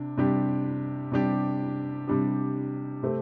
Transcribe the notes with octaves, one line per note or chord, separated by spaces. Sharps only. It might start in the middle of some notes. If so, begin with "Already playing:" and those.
Already playing: C3 D4
C3 G3 D4 G4
C3 G3 D4 G4
C3 G3 D4 G4
C3 A3 C4 G4